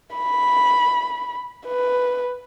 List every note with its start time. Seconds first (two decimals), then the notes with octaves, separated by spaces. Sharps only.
0.15 B5
1.67 B4